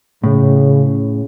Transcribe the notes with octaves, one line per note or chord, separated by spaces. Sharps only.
A2 C#3